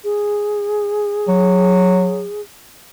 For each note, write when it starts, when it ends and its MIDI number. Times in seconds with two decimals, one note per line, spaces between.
0.04 2.41 68
1.28 2.27 54